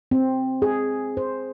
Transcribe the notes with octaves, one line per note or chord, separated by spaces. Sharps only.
C4
G#4
C5